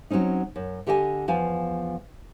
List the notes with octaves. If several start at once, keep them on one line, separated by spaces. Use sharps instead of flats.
F#3 G#3 C4 C#4 D#4
F#2
D3 G4 A4 D#5 E5 G#5
E2 F3 F5 G#5